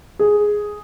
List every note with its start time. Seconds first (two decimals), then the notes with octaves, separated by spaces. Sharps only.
0.19 G#4